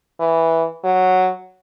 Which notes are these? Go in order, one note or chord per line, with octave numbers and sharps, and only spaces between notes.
E3
F#3